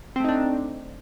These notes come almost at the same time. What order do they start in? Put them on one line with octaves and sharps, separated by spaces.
C4 A3 D#4 D4